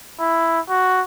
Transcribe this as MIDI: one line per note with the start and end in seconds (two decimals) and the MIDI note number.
0.20 0.60 64
0.69 1.03 66